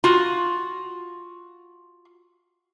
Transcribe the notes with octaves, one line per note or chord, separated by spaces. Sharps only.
F4 F#4